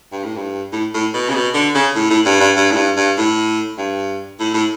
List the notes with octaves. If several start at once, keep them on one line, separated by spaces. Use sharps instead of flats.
G2
A2
G2
A2
A2
B2
C#3
B2
D3
C#3
A2
A2
G2
G2
G2
A2
G2
G2
A2
G2
A2
A2